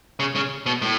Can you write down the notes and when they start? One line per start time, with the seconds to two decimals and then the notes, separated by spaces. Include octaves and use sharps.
0.20 C#3
0.35 C#3
0.66 B2
0.82 A2